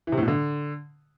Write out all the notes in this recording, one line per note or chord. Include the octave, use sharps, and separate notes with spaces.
E3
C3
A2
B2
D3